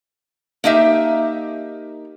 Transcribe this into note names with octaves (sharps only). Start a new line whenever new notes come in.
A#3 D#4 G4 E5